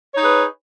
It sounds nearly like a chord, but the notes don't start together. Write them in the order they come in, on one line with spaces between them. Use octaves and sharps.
C#5 D#4 G#4 B4